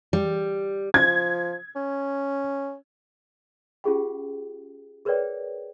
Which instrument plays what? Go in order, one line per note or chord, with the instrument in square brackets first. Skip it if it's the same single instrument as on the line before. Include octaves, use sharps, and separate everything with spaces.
[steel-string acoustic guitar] G3
[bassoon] F3 [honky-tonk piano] G#6
[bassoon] C#4
[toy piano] C#4 F4 G4 G#4 F5 G5
G#4 A#4 B4 C#5 D5 G5